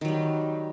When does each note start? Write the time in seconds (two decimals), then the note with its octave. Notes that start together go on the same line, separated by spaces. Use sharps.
0.01 D#3
0.05 F#3
0.08 G3